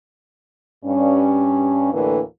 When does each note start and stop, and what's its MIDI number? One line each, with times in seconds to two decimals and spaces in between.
0.85 1.91 43
0.85 1.91 61
1.93 2.20 38
1.93 2.20 45
1.93 2.20 50
1.93 2.20 52
1.93 2.20 58